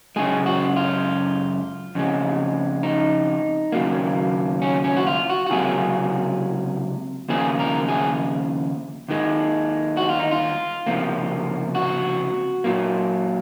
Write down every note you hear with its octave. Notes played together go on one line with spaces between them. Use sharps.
F#2 C#3 G#3 G#4
F#4
F4
F2 C#3 G#3
D#4
D#2 C#3 F#3 A#3
C#4
C#4
F#4
F4
F#4
F#4
C#2 C3 F#3 A#3 G#4
D#2 C#3 F3 A#3 G#4
A#4
G#4
D#2 D#3 G#3
F#4
F4
D#4
F4
C#2 C3 F3 A#3
F#4
A#2 F#3 A#3